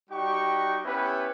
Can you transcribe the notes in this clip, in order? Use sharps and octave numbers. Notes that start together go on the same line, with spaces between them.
G3 D#4 F#4 G4 G5 C#6
B3 C#4 E4 G4 B4